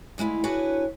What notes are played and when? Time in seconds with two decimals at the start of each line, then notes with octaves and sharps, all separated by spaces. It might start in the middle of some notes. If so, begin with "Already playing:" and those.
0.18 D2 G#3 E4 F4
0.44 D4 E4 F#4 G#4 B4 C#5